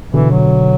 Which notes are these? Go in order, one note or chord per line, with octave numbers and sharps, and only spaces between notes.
B2 D3 E3
F#3